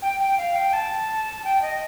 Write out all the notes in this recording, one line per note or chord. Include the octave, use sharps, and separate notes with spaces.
G5
G5
F5
G5
A5
G5
D#5